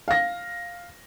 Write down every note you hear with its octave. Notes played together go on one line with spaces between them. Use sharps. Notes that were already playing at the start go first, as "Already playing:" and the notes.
F5 A#6